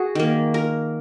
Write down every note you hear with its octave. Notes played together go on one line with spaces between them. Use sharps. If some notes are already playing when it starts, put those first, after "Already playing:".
Already playing: F#4 G#4
D#3 A#3
A#4